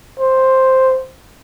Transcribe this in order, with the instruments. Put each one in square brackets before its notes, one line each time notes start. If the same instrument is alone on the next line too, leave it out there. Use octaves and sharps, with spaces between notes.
[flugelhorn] C5